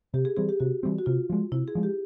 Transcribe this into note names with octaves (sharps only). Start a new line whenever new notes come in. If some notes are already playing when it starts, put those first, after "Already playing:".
C3 G4
G#4
E3 G3 C4 G#4
G4
C3 F#4
E3 G3 C4
F#4
C3 F4
F3 G#3
C3 E4
G#4
F3 G#3
G4